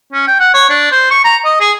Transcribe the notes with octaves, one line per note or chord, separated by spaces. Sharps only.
C#4
G5
F#5
C#5
D4
C5
C#6
A#5
D#5
G#4